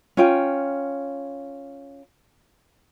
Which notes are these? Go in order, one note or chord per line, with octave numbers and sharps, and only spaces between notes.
C#4 F4 G5